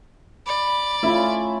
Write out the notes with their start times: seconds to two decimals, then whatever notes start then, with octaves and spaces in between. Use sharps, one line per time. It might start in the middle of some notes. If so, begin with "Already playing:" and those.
0.46 D5 B5
1.03 A3 C#4 E4 F4 E5